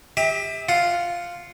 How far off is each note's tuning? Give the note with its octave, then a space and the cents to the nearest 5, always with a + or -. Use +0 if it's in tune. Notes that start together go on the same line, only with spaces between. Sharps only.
G4 +25 E5 -35
F4 +0 F#5 +0